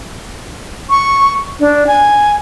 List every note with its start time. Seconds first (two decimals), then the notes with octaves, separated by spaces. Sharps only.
0.90 C#6
1.60 D4
1.87 G#5